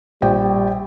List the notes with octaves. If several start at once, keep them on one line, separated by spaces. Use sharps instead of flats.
A#1 G3 G5